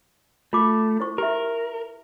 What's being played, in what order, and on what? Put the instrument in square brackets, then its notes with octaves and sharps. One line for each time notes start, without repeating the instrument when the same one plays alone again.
[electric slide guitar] A3 [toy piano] F4 D6
[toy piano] E4 C5 C#6
[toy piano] G4 E5 [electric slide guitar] A#4